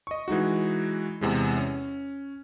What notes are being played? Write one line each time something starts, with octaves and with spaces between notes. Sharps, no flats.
D#5 C#6
E3 G#3 D#4 F#4
E2 C3 G#3
C#4